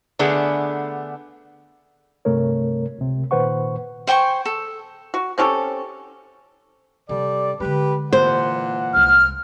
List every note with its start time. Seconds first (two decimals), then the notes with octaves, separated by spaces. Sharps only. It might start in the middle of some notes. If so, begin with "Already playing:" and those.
0.19 D3 A3 B3 D4 G#4
2.25 G2 C3 A3 A#4 C#5
2.98 C#2 C3
3.31 A#2 D#3 B4 C5 F#5 C#6
4.07 C5 G5 G#5 C#6
4.46 A4
5.14 F#4
5.38 C4 C#4 G4 A4
7.09 C3 G3 A4 D5
7.60 D3 G#3 G4 B4
8.13 A#2 E3 C5 F#5
8.94 C2 G#3 F6